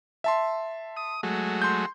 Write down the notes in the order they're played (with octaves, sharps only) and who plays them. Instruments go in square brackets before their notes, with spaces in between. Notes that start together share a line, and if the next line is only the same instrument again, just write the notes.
[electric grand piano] E5 A5 C6
[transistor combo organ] D#6
F#3 G#3 A3
[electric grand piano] C6 G6